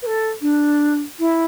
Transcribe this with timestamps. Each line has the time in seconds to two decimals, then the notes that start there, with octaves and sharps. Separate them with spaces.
0.02 B4
0.06 A4
0.41 D4
1.19 E4